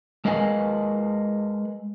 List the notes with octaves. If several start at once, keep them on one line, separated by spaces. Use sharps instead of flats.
G#3 A#4 B4 D#5 F5 G#5